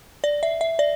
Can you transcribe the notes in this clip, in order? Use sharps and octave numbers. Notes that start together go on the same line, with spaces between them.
D5
E5
E5
D5